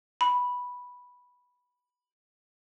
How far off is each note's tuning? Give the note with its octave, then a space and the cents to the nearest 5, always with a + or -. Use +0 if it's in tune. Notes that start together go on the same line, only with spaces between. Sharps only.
B5 -5